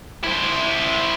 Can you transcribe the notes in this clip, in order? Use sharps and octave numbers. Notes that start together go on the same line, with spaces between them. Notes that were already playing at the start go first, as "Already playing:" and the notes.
E4 C5